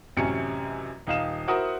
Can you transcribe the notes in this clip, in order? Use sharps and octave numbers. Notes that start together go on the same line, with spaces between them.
A1 F#2 C3 C#4 C#7
D#1 D#4 F5 E7
E4 F#4 A#4 C5 F#5 D#6